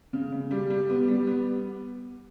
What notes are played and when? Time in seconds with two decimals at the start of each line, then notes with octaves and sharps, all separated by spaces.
0.13 C#3
0.32 C#3
0.51 G3
0.70 G3
0.89 B3
1.08 G3
1.27 B3